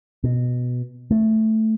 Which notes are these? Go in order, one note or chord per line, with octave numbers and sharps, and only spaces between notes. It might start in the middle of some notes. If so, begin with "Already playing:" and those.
B2
A3